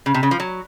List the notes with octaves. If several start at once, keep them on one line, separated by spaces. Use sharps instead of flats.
C#3
C3
C#3
F3
F#3